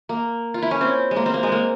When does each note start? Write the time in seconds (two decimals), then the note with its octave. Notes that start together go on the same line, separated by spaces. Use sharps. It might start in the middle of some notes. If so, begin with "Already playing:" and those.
0.09 A#3
0.54 F4
0.62 E4
0.71 C#4
0.81 C4
1.11 G#3
1.16 A#3
1.26 C4
1.34 A#3
1.43 G#3
1.52 A#3